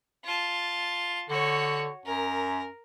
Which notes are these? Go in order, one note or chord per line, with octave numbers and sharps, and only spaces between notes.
F4 A5
D3 F#4 C#5
F#2 A#4